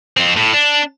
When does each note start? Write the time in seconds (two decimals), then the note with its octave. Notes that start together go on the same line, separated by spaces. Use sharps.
0.17 F2 C4
0.37 A2
0.54 D4